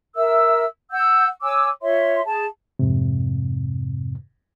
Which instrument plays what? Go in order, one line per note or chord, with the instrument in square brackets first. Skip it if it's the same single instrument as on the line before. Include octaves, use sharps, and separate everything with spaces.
[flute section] A#4 E5 E6
F#5 E6 G6
C#5 G#5 D6 E6
F4 C#5 E5 C6
G#4 A5
[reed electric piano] F2 G#2 C3